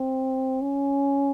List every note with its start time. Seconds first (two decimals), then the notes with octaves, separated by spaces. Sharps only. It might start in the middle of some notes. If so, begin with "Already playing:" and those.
Already playing: C4
0.62 C#4